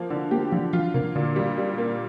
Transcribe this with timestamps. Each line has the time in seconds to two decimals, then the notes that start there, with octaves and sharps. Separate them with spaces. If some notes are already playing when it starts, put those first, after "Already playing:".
Already playing: F3 A#3
0.10 D3 D4
0.31 A#3 G4
0.52 D3 F3
0.73 F3 F4
0.94 C3 A#3
1.15 A#2 D3
1.36 G3
1.58 G3
1.78 A#3